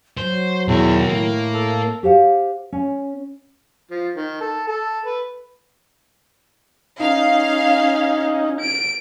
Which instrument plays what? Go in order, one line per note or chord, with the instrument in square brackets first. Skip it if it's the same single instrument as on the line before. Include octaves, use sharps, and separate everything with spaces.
[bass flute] F#3 [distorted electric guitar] C5
[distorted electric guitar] B1 F#4 [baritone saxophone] E2 [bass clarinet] D#3
[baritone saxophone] A2 [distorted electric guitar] A#3
[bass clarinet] A4 [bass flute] A#4
[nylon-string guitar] G4 C5 F5 F#5
C#4
[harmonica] F3
D#3
A4
A4
B4
[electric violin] C#4 [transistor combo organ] D#4 [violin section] F5
[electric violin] D7